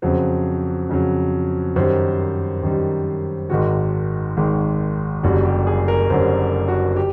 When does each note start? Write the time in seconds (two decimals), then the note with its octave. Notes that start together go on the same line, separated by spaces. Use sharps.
0.02 F2 C#3 F#3 C5
0.89 F2 C#3 F#3
1.76 F#2 D#3 G3 C5
2.63 F#2 D#3 G3
3.49 G#1 G#2 D#3 G#3 F#4
4.37 G#1 G#2 D#3 G#3
5.23 F#1 F#2 D3 G3 F#4
5.45 G4
5.67 G#4
5.88 A#4
6.10 F#1 F#2 D3 G3 C5
6.68 F#4
6.96 G4